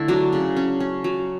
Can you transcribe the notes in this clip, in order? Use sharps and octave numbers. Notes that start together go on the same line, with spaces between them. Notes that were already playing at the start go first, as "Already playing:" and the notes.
Already playing: D3 A3 E4
F#3 D4
C#3
C#4
C#4
F#3